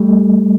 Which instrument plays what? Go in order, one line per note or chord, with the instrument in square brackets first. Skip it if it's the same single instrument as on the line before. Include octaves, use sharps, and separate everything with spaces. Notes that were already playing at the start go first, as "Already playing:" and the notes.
Already playing: [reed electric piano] G3 A3